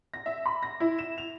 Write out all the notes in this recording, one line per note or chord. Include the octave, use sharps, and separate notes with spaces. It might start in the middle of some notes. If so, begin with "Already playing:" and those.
A#6
E5
B5
A#6
E4
E7
F7